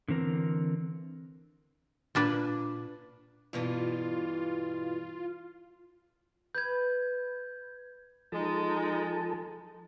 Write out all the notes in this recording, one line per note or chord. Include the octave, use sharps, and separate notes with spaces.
D3 E3 C4 A#4
A#2 D4 B4
G2 B2 E3 F4
B4 G6 G#6
F3 G#3 D#4 A4 A5